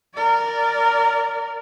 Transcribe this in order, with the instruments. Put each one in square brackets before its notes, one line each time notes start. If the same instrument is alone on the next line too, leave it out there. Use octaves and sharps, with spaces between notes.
[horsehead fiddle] A#4 D5